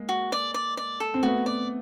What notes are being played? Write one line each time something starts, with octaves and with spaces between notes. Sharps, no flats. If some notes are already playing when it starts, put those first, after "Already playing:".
Already playing: G#3 A#3
F#4
D5
D5
D5
A4
C4
A3 B3 F#4
D5